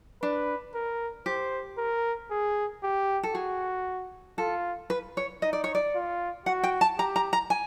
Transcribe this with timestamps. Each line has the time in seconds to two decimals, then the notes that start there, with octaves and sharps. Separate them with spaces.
0.22 D4 B4
0.74 A#4
1.26 G4 C5
1.78 A#4
2.31 G#4
2.83 G4
3.23 A4
3.34 F#4 G#4
4.38 F4 A4
4.90 B4
5.17 C#5
5.42 D#4 D#5
5.53 D5
5.64 C#5
5.75 D5
5.95 F4
6.46 F#4 F#5
6.63 G5
6.81 A5
6.98 G4 A#5
7.16 A#5
7.33 A#5
7.50 G#5